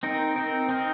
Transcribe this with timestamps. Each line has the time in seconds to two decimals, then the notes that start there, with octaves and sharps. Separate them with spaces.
0.03 C4 D#4 A#4
0.36 C4 D#4 A#4
0.69 C4 D#4 A#4